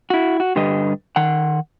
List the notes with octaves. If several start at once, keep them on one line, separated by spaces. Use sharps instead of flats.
E4 F#4
F#4
G2 D3 G3 B4 D#5
D#3 F#5